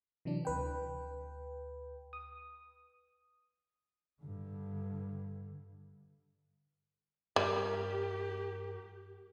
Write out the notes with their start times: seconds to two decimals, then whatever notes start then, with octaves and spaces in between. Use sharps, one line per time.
0.25 C3 E3 F#3 D4
0.45 D2 B4 G5
2.13 D#6
4.22 G2 D3
7.36 G2 G3 G4 A#4